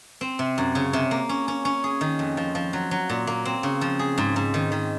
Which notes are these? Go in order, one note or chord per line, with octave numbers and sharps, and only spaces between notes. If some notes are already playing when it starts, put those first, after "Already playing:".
C4
C3
F#2
C#3
C3
A#3
C#4
C#4
C#4
G#4
D#3
F2
F3
F3
F#3
F#3
A#2
A#3
C4
C#3
F3
G#4
G#2
G#2
D#3
D#3